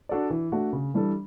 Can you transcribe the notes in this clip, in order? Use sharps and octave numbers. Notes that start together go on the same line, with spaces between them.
D4 F#4 A4 D5
E3
A3 D4 F#4
C#3
E3 G3 D4 A4